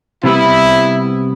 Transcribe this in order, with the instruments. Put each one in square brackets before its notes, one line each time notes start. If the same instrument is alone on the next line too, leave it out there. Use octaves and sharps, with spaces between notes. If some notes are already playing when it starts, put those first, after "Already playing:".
[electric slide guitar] C3 G3 B3 [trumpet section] E4